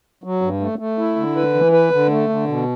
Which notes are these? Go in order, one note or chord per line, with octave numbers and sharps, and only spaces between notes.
F#3
G2
A3
A3
E4
D3
B4
E3
B4
D3
A3
D3
B2